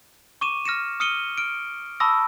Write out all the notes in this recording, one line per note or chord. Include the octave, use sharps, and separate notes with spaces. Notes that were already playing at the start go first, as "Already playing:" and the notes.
C#6 D6 D#7 E7
F6 A#6 C#7 E7
D#6 F6 C#7 D#7 G7
F6 D7
A5 B5 C#6 D#6 E6 A#6